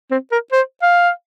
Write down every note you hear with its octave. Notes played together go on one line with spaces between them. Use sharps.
C4
A#4
C5
F5